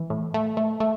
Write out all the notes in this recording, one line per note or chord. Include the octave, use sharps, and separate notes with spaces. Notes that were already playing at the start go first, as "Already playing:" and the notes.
Already playing: E3
A2
A3
A3
A3